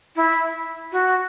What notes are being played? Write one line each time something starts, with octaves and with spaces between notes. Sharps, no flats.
E4
F#4